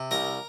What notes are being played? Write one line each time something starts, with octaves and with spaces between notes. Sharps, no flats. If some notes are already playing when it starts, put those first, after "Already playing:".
Already playing: C3
C2 A#4 A#5